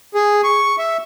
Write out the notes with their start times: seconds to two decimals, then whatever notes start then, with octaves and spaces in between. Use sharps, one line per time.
0.14 G#4
0.44 C#6
0.78 E5